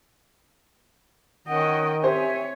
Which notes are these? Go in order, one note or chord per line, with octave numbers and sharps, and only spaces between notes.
D#3 C#4 D#5 F#5 G5
C4 G4 C5 C#5 E5 G5 G#5